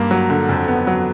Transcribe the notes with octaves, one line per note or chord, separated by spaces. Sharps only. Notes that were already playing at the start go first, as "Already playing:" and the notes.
Already playing: G2 A#3
F#3
D3
F2
B3
F#3